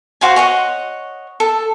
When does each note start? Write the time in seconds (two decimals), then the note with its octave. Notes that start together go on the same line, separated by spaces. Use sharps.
0.21 F#4 C5 F5 G#5
0.36 C#5 D#5 F#5
1.40 A4